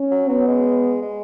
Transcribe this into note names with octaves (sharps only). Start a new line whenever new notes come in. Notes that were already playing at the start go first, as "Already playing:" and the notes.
Already playing: C#4
F#3
F#3 B3
G#3
G#3